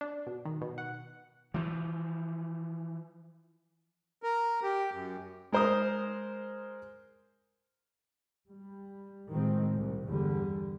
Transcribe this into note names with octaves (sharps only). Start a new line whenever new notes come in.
D4
B2
D#3
B2
F#5
E3 F3
A#4
G4
F#2
G#3 A#4 C5 A#5 D#6
G3
A2 D#3 F3 G#3 C4
C2
E2 G2 D3 G3